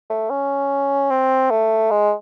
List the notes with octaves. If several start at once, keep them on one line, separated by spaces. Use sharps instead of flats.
A3
C#4
C4
A3
G#3